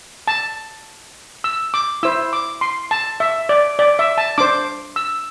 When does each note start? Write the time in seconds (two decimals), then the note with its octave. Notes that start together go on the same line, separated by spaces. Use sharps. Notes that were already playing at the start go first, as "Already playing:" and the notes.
0.28 A5
1.44 E6
1.74 D6
2.03 E4 C5 E6
2.33 D6
2.61 C6
2.91 A5
3.20 E5
3.49 D5
3.79 D5
3.99 E5
4.18 A5
4.38 D4 C5 D6
4.96 E6